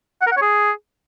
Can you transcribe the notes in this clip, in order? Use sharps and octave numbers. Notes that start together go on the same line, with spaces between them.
F#5
A#4
F#5
C#5
G#4